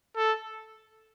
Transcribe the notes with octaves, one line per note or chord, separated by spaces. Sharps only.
A4